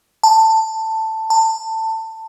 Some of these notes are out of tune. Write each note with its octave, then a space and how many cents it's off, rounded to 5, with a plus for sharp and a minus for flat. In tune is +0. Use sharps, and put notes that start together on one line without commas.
A5 +10
A5 +20